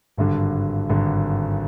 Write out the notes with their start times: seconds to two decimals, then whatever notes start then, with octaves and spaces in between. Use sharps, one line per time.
0.17 G#1 G2 D3
0.89 G#1 G2 D3